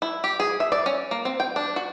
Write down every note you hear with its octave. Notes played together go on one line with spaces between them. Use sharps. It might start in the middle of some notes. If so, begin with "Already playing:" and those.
E4
G4
G#4
E5
D5
C#4
A#3
C4
G5
D4
F#4